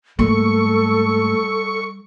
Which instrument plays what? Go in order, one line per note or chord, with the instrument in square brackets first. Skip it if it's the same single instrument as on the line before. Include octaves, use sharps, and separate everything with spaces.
[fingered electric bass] G#2 A3 A#3 [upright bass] G3 [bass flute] A4 [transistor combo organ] C#6